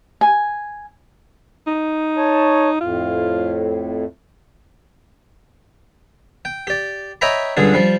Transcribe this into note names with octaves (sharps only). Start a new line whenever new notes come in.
G#5
D#4
C#5 A5
F2 A2 F4
G5
G4 D5
C#5 D#5 E5 G5 A#5 B5
C#2 G2 D3 G#4
F3 G3